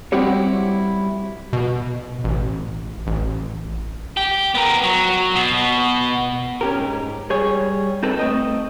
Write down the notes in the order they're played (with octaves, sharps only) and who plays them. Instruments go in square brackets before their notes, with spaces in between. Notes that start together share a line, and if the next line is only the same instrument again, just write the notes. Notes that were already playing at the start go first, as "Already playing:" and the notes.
[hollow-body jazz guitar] G3 C4 E4 F#4 G4 C#5
[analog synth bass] B2
A1
A1
[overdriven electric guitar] G4
B3 A#4
F#3
B2
[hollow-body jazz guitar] C#4 G4 A#4
G#2
G3 G#4 C#5
C4 D#4 A4 B4
A3 C4 D#5